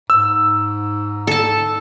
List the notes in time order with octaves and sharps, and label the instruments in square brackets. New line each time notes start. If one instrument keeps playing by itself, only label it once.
[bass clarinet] G#2 [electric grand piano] E6
[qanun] A4 A5